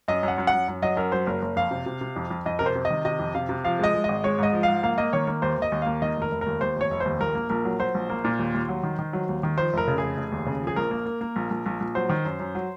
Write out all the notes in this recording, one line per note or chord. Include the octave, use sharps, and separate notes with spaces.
F#2 D#5
F#2
F#5
F#2
F#5
F#2
F#2
F#3 D#5
F#2 A#4
F#3 C5
F#1 A#4
F#1
F2 F5
C3
C3
C3
F2
F2
F2 D#5
C3 A#4
C5
C3
D#5
D#3
C3 D#5
F2
C3 F5
C3
F3 F5
G#3 D#5
G#3
G#1 D#5
G#3 C#5
G#2 D#5
F3
G#2 F5
A#3 F5
A#3 D#5
D#3 C#5
A#3
D#2 C5
D#2 D#5
D#2
A#3 F5
D#3 D#5
F1
A#4
F1
D#2 A#4
D#2 C5
F1 C#5
F1
D#2 C5
A#1 A#4
A#3
A#1 A#4
F#3
F#3 C5
A#1
A#3
A#2
D#2
D#2
F#3
D#3
D#3
F#3
D#2
D#3
F3 C5
F1 A#4
C#3
F1 G#4
F1
D#2
C#3
F3
G#4
A#1 A#4
A#3
A#3
A#3
A#1
A#1
A#1
A#1
F#3 C5
D#3
F#2
F#2
F#3